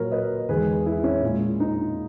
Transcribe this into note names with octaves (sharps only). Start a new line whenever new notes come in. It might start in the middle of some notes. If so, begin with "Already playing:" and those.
Already playing: A#2 F#3 A#4 C#5
B4 D#5
E2 D#3 G#3 G#4 B4
E4 G#4
C#4 E4
A#2 G#3
D#4